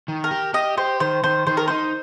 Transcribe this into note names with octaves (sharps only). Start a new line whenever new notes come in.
D#3
A#4
G4
G4 D#5
G4 C5
D#3 C5
D#3 C5
D#3 C5
A#4
D#4 C5